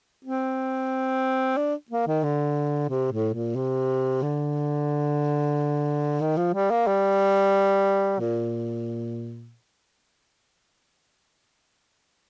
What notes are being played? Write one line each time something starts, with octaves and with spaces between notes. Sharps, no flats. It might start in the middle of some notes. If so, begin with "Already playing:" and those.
C4
D4
A#3
D#3
D3
C3
A2
A#2
C3
D3
D#3
F3
G3
A#3
G3
A#2